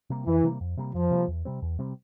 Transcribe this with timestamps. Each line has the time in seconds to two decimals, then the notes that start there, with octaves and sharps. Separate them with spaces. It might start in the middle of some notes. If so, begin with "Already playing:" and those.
0.10 C3 G3 A#3
0.26 F2 E3
0.43 C3 G3 A#3
0.61 F2
0.77 C3 G3 A#3
0.94 F2 F3
1.11 C3 G3 A#3
1.28 E2
1.45 C3 G3 C4
1.62 E2
1.79 C3 G3 C4